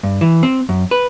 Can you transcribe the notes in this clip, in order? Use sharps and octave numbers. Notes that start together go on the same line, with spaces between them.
G2
E3
C4
F#2
B4